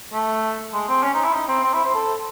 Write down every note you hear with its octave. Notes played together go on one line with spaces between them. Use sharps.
A3
G#3
C4
C#4
D#4
E4
D#4
C4
C4
E4
C5
A4